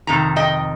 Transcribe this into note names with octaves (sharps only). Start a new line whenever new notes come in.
F2 C3 D#3 A#5
D#5 G5